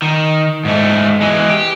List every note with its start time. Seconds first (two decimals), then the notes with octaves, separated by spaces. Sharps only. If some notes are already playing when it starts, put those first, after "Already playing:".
0.02 D#3
0.65 G#2 A3
1.21 E3 G#3
1.49 G4